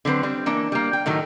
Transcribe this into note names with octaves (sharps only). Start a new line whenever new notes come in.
D3 F#3 C4 B4
G3 C4
E3 A#3 D4
G3 A#3
G5
A2 D#3 F#3 A3